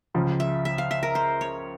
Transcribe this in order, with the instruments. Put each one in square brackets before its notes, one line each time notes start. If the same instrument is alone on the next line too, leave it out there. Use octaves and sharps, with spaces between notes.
[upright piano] C#2 C#3 F3
[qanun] E5
E5
F5
E5
A#4
C5
C#5